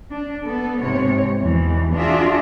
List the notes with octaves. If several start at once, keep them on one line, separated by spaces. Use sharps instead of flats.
D4
B3 A4
G#2 C3 C#5
E2 B2 E3
D4 F4 F#4 G#4 E5